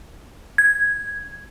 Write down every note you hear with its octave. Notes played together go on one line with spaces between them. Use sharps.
G#6